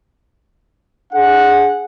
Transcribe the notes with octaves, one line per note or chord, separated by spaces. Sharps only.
D4 G#4 F#5